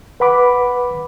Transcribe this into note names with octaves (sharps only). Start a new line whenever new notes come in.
B4 F#5 B5 D6